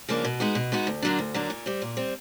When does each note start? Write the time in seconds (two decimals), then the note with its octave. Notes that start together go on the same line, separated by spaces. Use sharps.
0.09 C#3 F3 A#3 D4
0.25 B2
0.40 G#3 B3 D#4 F#4
0.55 B2
0.72 G#3 B3 D#4 F#4
0.87 D2
1.02 D3 F#3 A#3 D4
1.19 D2
1.34 D3 F#3 A#3 D4
1.50 A#2
1.66 G3 C4
1.82 A#2
1.97 G3 C4